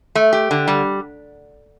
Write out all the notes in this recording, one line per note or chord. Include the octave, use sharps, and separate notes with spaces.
A3
G4
D3
G3